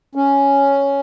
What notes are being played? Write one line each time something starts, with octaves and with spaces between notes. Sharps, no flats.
C#4